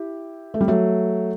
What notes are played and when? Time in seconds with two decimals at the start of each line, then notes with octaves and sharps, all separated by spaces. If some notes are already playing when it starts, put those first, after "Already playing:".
Already playing: E4 G4
0.54 A3
0.61 G3
0.68 F#3 A3